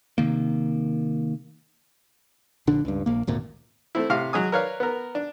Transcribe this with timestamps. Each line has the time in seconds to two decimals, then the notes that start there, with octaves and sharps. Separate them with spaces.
0.18 C3 D#3 A#3
2.67 A#1 D3 D4
2.85 C#2 G2
3.06 A#1 A#3
3.27 G#1 D2 A#2
3.95 A3 C4 E4
4.10 A2 C3 F5
4.33 F#3 G#3 G#5 D#6
4.52 A#4 B4 C#5 D5 F5
4.80 B3 A#4
5.15 D4